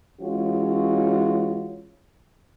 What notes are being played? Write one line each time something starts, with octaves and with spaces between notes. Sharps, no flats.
E3 G#3 C#4 F4 F#4 C#5